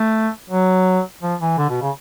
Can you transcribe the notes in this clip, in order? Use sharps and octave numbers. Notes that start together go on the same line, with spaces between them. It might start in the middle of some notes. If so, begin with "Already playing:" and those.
Already playing: A3
F#3
F3
E3
D3
B2
C#3